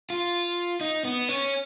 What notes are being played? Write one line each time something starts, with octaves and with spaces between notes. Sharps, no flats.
F4
D#4
B3
C#4